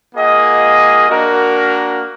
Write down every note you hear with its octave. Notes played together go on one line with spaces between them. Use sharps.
A#3 F4 G#4 D#5 F#5
A#3 D4 F#4 A#4